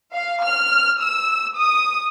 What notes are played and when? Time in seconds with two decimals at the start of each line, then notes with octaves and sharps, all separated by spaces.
0.13 F5
0.44 F6
1.00 E6
1.56 D#6